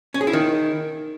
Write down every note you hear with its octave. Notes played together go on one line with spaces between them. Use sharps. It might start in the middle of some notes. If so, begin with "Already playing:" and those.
C#4
G#4
E4
D#3